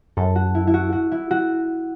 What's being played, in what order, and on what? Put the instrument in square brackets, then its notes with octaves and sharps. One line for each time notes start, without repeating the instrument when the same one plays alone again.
[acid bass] F#2 [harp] A4
[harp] F#4
E4
E4
F#4
F#4
E4
F#4